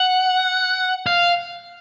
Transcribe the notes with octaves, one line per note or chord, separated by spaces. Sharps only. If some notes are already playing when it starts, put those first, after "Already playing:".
Already playing: F#5
F5